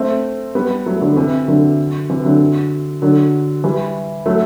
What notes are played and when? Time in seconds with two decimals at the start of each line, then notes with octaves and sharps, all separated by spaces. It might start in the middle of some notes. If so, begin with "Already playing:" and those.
Already playing: A3 C4
0.55 G3 B3
0.86 F#3 A3
1.01 D3 F#3
1.16 C3 E3
1.48 D3 F#3
2.10 C3 E3
2.25 D3 F#3
3.02 D3 F#3
3.64 E3 G3
4.26 F#3 A3